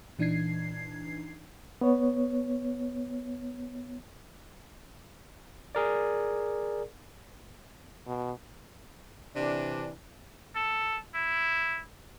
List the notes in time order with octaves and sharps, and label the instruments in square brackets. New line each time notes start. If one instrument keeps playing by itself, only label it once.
[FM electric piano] A#2 E3 D4 D#4 G#6 C7
[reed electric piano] B3 C#5
[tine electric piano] G#4 A#4 D5
[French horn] B2
[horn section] C3 E3 D4
[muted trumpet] A4
E4